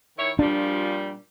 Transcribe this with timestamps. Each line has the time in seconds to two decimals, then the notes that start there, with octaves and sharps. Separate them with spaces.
0.17 D#3 E4 C#5
0.39 A#2 F3 G3 D4